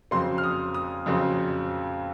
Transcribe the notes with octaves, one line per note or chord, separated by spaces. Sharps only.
F2 C#3 F#3 C4 C6
F6
D#6
D#6
F2 C#3 F#3 C4